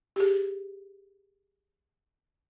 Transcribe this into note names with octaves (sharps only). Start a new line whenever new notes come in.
G4 G#4